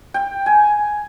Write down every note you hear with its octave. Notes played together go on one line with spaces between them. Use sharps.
G5
G#5